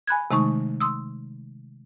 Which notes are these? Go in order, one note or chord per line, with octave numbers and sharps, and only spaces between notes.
G#5 B5 F#6 G#6
C3 D#3 G#3 A3 D#4 C#6
C6 D#6 E6